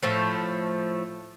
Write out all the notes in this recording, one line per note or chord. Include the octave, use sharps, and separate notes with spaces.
A2 F3 A3